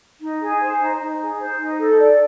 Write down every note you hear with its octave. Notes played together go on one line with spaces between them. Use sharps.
D#4
G#4
C5
D#4
D#4
G#4
C5
D#4
A4
D5